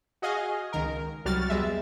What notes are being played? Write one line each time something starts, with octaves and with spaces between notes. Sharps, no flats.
F#4 G#4 D#5 F5 G#5
C#2 D#3 A#4
C2 F#3 G3 F#4 F6 A6
E2 G3 G#3 E5